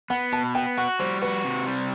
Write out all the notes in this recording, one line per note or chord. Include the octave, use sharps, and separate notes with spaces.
B3 F#5
B2 A5
B3 G5
F#4 F#5
G3 C5
F#4 B4
C3
G3